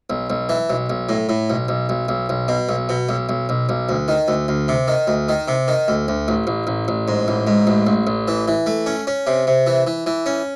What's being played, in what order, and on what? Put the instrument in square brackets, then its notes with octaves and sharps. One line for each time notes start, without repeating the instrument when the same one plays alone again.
[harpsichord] B1
B1
E3
B1
B1
A2
A2
B1
B1
B1
B1
B1
B2
B1
B2
B1
B1
B1
B1
D2
D#3
D2
D2
C3
D#3
D2
D#3
C3
D#3
D2
D2
A1
A1
A1
A1
G#2
A1
G#2
A1
A1
A1
E3
E3
A3
C#4
C#4
C3
C3
E3
E3
E3
C#4